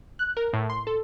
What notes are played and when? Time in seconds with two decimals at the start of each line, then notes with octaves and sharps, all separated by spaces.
0.19 F#6
0.37 A#4
0.53 A2
0.70 C6
0.87 A4